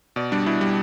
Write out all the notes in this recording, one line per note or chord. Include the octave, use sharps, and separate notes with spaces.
B2 D5
G3 D4
B2 E4
G3